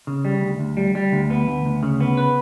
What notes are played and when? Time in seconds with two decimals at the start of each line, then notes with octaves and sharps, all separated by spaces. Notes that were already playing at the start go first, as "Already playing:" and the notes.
0.07 C#3
0.25 G3
0.41 D2
0.59 D2
0.77 G3
0.95 G3
1.12 D2
1.30 B3
1.48 D2
1.65 D2
1.83 C#3
2.01 B3
2.18 B4